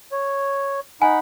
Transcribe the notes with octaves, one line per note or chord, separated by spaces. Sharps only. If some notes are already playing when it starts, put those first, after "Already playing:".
C#5
D#4 F#5 G#5 B5